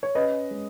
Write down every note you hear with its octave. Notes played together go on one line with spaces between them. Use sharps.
C#5
C#4 B4 D#5
G#3